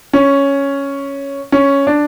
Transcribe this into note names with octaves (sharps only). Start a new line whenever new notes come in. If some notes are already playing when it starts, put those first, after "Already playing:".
C#4
C#4
D4